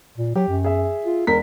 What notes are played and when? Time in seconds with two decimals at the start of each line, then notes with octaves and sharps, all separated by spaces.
0.18 A#2
0.36 F#3 G4
0.48 F#2
0.64 G#4 E5
1.05 F4
1.27 E1 A#4 B6